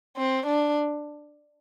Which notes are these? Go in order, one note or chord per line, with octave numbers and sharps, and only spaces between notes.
C4
D4